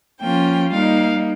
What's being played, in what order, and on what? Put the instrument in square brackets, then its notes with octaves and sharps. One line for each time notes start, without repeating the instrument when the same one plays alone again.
[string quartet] F3 A#3 C#4 F4 G5
G3 A#3 D#4 F5